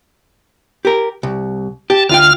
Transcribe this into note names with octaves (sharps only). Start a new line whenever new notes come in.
G4 A#4
C2
G4 A5
D2 F4 G5 F6